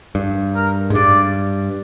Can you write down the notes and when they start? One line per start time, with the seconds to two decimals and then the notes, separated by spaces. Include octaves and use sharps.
0.15 G2
0.56 A#4
0.90 G#2
0.95 G2 D5